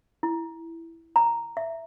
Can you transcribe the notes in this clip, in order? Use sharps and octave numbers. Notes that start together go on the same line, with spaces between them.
E4
A#5
E5